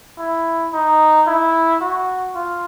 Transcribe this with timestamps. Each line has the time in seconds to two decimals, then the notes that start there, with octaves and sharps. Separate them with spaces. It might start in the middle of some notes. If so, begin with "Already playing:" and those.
0.18 E4
0.73 D#4
1.27 E4
1.81 F#4
2.36 F4